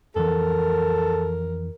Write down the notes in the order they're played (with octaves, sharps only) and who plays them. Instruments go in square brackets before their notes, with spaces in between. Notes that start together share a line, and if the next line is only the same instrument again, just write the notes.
[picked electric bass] F2 E3 [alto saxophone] A4 [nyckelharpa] A#4